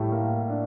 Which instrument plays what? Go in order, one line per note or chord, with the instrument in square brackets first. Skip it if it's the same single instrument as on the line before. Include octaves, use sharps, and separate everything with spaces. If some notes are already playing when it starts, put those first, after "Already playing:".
Already playing: [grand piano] A2 A3 [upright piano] G3
[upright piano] A#3
D4